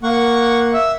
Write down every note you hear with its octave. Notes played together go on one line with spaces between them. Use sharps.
A#3 F#5 C#6
E5